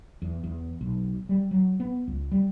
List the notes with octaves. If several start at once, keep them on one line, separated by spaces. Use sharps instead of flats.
E2
E2
B1
G3
F#3
B3
C#2
G3